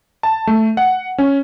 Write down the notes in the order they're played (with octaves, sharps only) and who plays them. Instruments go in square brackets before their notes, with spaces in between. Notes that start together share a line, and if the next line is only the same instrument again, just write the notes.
[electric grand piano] A5
A3
F#5
C#4